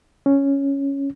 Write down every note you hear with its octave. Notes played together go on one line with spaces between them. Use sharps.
C#4